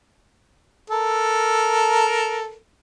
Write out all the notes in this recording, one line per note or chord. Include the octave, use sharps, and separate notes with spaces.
A4 A#4